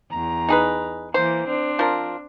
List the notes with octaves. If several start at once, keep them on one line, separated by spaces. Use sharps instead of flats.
E2 A#5
D#4 G#4 B4
E3 A#3 C5
C4 D4
F3 A#4